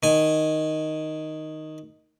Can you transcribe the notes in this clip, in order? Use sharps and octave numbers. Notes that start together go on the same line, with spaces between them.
D#3 G#5